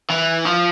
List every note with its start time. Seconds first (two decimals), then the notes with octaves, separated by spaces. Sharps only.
0.10 E3
0.45 F3